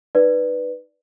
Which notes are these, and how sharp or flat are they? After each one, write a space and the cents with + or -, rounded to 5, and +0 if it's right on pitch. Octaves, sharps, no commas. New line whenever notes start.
D#4 +0 B4 +0 D5 +0